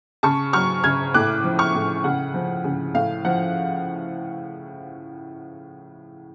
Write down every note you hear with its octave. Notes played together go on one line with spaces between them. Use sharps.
C#3 A5 C#6
F#3 C#6 F6
C#3 F6 G#6
A2 D6 F#6
F3
C#6 F6
A2
C#3 F#5
F3
C#3
A2 F5
F3 F#5